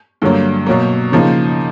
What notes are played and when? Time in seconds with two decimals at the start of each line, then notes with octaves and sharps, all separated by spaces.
0.22 G2 D3 F#3 A#3
0.66 B2 F#3 A#3
1.12 C#3 F3 A#3 D#4